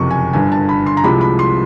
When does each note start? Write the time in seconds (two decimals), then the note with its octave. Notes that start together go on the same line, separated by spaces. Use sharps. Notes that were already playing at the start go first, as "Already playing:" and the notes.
Already playing: F#1 F2 C3 C#6
0.11 G#5
0.33 G1 G2 D3 G#5
0.52 A5
0.69 B5
0.86 C6
0.97 A#5
1.03 C2 C3 F3 G#3 B5
1.21 B5
1.39 C6